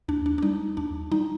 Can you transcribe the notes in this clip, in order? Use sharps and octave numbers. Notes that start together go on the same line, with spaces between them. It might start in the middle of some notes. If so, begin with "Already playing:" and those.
D#2 D4
D4
D4
G3 D#4
D#2 D4
G3 D#4